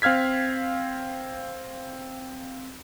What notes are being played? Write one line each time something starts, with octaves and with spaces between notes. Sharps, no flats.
C4 F5 F6 G#6 B6